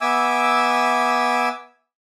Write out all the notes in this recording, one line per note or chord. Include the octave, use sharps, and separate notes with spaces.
B3 E5 G#5 D6 E6